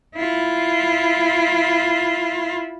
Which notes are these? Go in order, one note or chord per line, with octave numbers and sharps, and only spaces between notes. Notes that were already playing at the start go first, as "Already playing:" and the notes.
E4 F4